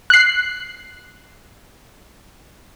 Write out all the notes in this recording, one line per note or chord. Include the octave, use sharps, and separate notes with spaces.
F#6 C7